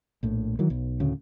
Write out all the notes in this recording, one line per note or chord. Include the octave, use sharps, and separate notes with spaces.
A#1 A2
D#3 E3 F#3
B1
D2 A2 C#3